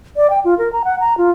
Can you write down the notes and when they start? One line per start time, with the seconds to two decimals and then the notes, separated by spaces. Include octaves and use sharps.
0.17 D5
0.30 G5
0.45 F4
0.58 A#4
0.73 A#5
0.85 F#5
1.00 A#5
1.18 F4